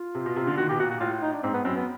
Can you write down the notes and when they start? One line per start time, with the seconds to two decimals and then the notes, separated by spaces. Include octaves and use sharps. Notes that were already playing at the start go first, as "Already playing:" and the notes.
Already playing: F4
0.15 C3
0.26 B2
0.36 C3
0.47 D3
0.57 D#3 F#4
0.69 B2 G4
0.80 A#2 F#4
0.90 F#4
1.00 A2 F4
1.22 D#4
1.33 D4
1.43 G#2 C4
1.54 B3
1.65 F#2 C4
1.76 B3